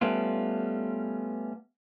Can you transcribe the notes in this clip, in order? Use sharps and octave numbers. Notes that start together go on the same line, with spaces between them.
G3 A3 B3 C#4 F4